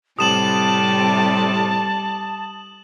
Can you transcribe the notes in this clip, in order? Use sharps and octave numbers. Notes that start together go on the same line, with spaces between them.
A2 C3 G3 A5 D#6 E7 F#7